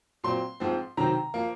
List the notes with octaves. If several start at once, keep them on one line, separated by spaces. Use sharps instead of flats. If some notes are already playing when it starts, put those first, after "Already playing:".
A#2 F#3 C4 C6
G#2 F3 C4
C3 D#3 F#3 C4 A#5
F3 A#3